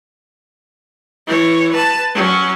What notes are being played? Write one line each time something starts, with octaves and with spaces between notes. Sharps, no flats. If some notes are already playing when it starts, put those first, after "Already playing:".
E3 C#5
B4 A5
F#3 C#4